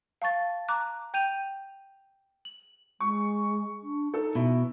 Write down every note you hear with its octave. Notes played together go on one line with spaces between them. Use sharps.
F5 A5 C#6 A6
A#5 D6 F#6
G5 G6 D#7 F7
F#7
G#3 C#6
D4
D#4 A4
B2 E4